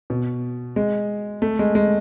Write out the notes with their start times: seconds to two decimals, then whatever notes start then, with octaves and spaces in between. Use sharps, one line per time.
0.10 B2
0.76 G#3
1.42 A3
1.59 G#3
1.75 G#3